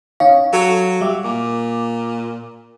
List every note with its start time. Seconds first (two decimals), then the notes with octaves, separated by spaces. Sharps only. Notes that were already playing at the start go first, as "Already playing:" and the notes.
0.20 C#4 D#4 C#5 F5
0.53 F#3 A4
1.01 G3 E5 D6
1.24 A#2 D6